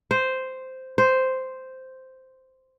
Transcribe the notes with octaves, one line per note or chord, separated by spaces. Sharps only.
C5
C5